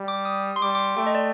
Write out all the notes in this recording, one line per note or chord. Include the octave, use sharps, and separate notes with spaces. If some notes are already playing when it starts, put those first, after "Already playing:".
Already playing: G3
D6
D#6
C6
G3 D6
D6
C6
A3 G5
D#5
D5